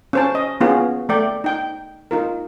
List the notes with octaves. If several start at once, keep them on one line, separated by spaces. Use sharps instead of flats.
C#4 C5 A5
D#5
B3 C#4 F4 G#4
A3 D5 G5
D#4 G5
D#4 F4 A#4